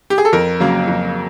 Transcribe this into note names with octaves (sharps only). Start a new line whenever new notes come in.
G4
G#4
A4
F2 A#4
C#3 F#3 A#3
F2